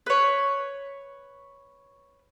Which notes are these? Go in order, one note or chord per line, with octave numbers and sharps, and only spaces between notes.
B4 C#5